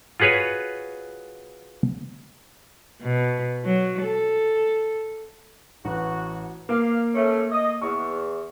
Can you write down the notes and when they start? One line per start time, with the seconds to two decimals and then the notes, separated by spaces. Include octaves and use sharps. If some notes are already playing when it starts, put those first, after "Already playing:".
0.20 F4 F#4 G#4 B4 C#5
3.02 B2
3.65 F#3
4.02 A4
5.85 A1 F#4
6.69 A#3 F5 D6
7.15 A3 C#4
7.52 D#5
7.82 E2 C#6